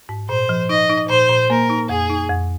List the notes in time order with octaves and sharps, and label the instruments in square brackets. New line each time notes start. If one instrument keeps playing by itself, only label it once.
[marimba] G#2
[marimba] A#2 [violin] C5
[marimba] F3
[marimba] D#4 [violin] D#5
[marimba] D#4
[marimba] A#2 [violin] C5
[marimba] A#2
[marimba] A#3 [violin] A#4
[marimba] D#4
[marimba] F2 [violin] G#4
[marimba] D#4
F2